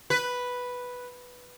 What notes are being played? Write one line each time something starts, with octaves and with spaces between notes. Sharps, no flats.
B4